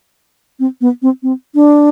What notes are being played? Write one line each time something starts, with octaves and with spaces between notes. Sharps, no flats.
C4
B3
C4
C4
D4